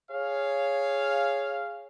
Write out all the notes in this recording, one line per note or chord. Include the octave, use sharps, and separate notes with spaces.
G#4 C#5 F5